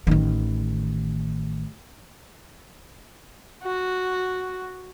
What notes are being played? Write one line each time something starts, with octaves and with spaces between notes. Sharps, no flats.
A1 D#3
F#4